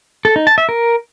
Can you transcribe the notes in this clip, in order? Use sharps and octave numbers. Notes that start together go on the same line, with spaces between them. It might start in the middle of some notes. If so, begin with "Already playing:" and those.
A4
D#4
A5
E5
A#4